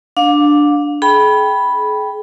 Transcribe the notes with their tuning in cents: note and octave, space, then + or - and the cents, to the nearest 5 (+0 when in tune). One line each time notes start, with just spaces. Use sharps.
D4 +0 F5 +40
G#4 +40 G5 +0 B5 -5